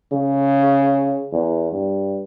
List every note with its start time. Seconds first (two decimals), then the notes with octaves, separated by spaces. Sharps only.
0.12 C#3
1.32 E2
1.72 G2